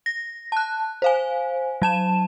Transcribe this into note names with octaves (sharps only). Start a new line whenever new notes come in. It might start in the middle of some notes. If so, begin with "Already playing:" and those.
A#6
A5 F#6
C5 F5 G#5
F#3 A5 E7